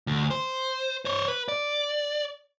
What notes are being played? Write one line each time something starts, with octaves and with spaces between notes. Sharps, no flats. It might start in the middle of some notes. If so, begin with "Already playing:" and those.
D2
C5
C5 C#5
B4
D5